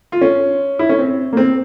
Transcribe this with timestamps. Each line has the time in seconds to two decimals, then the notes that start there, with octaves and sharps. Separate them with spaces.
0.12 F4
0.21 C#4
0.79 E4
0.89 C#4
0.99 C4
1.33 A#3
1.37 C4